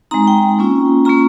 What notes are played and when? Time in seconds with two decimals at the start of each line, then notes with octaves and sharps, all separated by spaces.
0.11 G#3 C4 D#4 A#5
0.27 G5
0.59 A#3 C#4 F4
1.05 A#3 C#4 F4 A#5